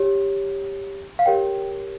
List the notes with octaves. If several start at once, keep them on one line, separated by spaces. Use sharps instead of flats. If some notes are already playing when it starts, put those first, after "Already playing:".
Already playing: G4 C#5
F5
G4 A#4 C#5 G5